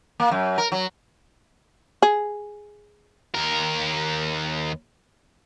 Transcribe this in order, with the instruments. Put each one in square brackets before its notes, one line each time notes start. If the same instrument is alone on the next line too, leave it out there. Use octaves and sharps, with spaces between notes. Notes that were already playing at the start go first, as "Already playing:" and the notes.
[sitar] A#3
F#2
A#4
F#3
[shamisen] G#4
[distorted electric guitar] D#2 A#4